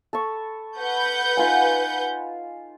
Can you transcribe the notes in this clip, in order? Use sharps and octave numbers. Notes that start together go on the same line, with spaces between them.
A4 B5 C#6
B4 F#5 G6
D#4 F4 G#5